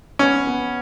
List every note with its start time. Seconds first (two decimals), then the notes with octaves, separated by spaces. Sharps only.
0.19 B3 C#4
0.47 B3